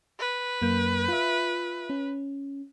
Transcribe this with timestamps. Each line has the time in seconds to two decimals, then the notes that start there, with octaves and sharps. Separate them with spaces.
0.20 B4
0.62 F#2 A#3 G6
1.08 F4 E5
1.90 C#4